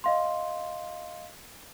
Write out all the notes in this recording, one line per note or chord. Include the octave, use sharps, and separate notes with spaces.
D#5 F5 C6